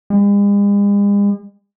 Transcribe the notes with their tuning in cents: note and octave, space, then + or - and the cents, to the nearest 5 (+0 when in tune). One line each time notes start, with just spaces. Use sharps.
G#3 -45